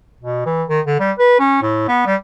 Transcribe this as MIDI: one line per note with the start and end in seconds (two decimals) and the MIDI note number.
0.21 0.45 47
0.46 0.63 52
0.69 0.80 51
0.87 0.97 50
1.00 1.12 55
1.19 1.36 71
1.40 1.58 61
1.62 1.85 45
1.88 2.03 59
2.06 2.16 55